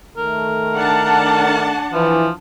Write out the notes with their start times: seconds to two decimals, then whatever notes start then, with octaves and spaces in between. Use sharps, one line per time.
0.17 D#3 A3 A#4
0.76 D4 F#5 A5
1.93 E3 F3